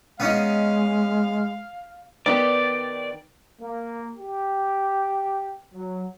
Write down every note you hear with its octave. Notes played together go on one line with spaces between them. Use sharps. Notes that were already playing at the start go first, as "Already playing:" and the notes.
G#3 B3 C#4 D#4 F5
D#3 B3 G4 D5
A#3
G4
F#3